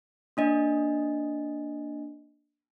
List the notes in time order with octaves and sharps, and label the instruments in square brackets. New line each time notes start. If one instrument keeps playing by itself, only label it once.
[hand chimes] A#3 D4 D#5